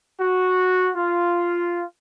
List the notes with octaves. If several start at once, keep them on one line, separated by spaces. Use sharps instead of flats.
F#4
F4